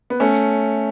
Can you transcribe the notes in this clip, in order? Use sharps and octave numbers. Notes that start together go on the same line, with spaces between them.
B3
A3 C#4